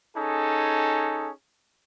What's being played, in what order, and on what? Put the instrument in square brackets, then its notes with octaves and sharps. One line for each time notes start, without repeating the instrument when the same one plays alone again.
[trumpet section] C#4 D#4 G#4 A4